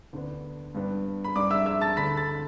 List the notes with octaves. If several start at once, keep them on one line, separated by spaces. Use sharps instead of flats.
D2 D3 B3 D4
G2 G3 B3 D4
B5
G2 G3 D4 D5 D6
E5 E6
E5 E6
A5 A6
D2 D3 A3 B5 B6
A5 A6